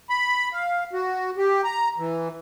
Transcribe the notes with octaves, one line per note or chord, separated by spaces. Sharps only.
B5
F5
F#4
G4
A#5
E3